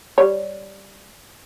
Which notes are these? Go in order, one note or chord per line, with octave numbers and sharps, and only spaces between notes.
G3 C#5